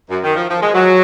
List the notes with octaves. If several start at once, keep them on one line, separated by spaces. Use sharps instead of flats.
F#2
D#3
F3
F3
G#3
F#3